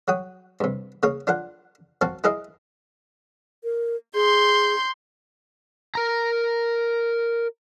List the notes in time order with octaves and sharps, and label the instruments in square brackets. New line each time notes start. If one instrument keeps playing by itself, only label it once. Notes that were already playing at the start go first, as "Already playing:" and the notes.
[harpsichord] F#3 F#4 G5 D#6
G2 C3
C#3 A#3 A#4 C#5
D4 F4 A#4 F#5
C4 F#4 A#4 F5 A5
E4 G#4 A#4 D#5 F5
[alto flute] A#4
[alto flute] G#4 [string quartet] C6 G6
[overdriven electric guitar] A#4 A#5